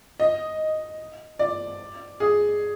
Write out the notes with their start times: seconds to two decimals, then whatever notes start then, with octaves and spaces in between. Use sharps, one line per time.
0.20 D#5
1.39 D5
2.20 G#4